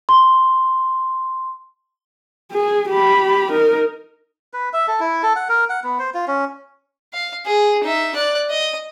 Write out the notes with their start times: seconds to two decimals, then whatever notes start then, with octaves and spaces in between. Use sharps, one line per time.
0.09 C6
2.52 G#4
2.89 G4 B5
3.51 D#4 A#4
4.53 B4
4.73 E5
4.88 A4
5.00 E4
5.23 A4
5.36 F#5
5.49 A#4
5.69 F#5
5.84 B3
5.99 C5
6.14 F4
6.27 C#4
7.14 F5
7.46 G#4
7.84 D#4 E5
8.15 D5 F#6
8.50 D#5